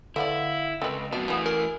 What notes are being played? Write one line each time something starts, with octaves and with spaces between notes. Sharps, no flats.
D3 A3 B3 E4 D5 F5
C#2 C4 A4 B4 D#5
F#2 B2 D4 F#4
C#3 E3 A3 B3
G#4 A#4